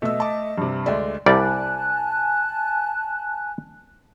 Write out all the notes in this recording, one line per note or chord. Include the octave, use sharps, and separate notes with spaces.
B2 A3 D#5 E6
A5 D6
G2 C3
D2 G#3 A4 D5 E5
C2 G3 D5 G#5 A5 F#6